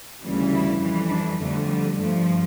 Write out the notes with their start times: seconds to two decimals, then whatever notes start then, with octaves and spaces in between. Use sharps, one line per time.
0.23 D2 C#3 E3 G3
0.52 E4
0.80 F2 E3 G3
1.10 D4
1.40 F2 D3 G3 A3
1.69 G3
1.98 G2 F3 A3